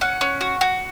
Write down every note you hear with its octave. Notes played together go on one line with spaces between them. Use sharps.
C#4 F#5
C#4
F#4
F#4